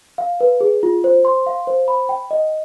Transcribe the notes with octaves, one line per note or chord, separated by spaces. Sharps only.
F5
B4
G#4
F4
C5
C6
F5
C5
B5
G5
D#5